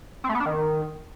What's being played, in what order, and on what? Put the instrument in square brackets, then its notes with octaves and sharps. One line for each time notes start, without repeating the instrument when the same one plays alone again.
[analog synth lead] C4
A3
B3
D4
D#3